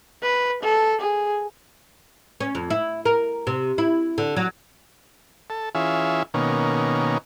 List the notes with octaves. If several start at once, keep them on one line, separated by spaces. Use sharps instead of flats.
B4
A4
G#4
C#4
F2
E4
A#4
C3
E4
D3
F#3
A4
E3 C#4 F4 G#4 E5
B2 D#3 A#3 C#4